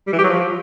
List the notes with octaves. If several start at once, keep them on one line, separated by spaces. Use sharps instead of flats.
G3
E3
G4
F#3
F3